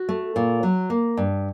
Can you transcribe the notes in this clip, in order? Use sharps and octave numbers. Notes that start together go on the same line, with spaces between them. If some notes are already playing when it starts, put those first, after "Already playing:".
Already playing: F#4
A3
A#2
F#3
A#3
G2